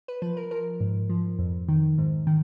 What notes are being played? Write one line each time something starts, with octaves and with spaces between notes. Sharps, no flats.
B4
F3 B4
A#4
F3 A#4
G#2
F3
F2
D#3
G#2
D#3